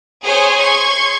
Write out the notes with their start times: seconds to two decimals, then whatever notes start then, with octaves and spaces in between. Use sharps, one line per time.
0.24 G#4 C5 C#5 G#5
0.58 C6 C#6 G#6